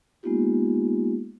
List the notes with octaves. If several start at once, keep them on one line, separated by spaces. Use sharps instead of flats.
G#3 A#3 B3 D#4 F4 G4